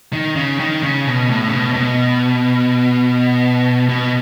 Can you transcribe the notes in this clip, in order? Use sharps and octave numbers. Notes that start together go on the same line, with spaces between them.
D#3
C#3
D#3
C#3
B2
A2
C#3
B2
A2
B2
B2